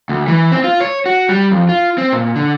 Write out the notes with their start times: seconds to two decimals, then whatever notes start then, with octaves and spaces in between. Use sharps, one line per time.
0.09 D2
0.28 E3
0.52 C4
0.64 F4
0.81 C#5
1.06 F#4
1.29 G3
1.51 F2
1.69 F4
1.98 C4
2.13 A#2
2.36 D3